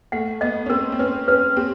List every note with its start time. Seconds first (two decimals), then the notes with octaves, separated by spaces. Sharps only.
0.12 A3 F#5
0.41 B3 D#5
0.66 C#4
0.70 C4 A#4
0.92 C4
0.99 C#4 B4
1.28 C#4 B4
1.57 C4 G4